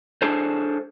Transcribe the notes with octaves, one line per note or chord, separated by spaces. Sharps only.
D4 G#4 A4 C5